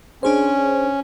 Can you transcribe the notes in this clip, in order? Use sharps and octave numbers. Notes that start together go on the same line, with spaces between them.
C#4 D4 G#4 C5